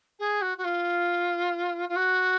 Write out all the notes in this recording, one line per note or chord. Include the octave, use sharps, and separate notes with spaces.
G#4
F#4
F#4
F4
F4
F#4